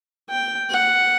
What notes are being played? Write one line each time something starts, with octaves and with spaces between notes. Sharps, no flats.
G5
F#5